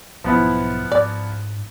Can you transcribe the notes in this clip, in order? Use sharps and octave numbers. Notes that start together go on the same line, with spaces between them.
B1 G#2 F3 B3 E4
G#2 D5